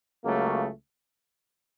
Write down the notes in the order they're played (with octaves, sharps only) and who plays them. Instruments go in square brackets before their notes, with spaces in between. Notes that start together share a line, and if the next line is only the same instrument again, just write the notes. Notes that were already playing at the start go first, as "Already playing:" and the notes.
[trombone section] C#2 C#3 F#3 A3 A#3